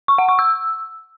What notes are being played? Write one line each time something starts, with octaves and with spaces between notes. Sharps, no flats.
C#6
F#5
C#6
E6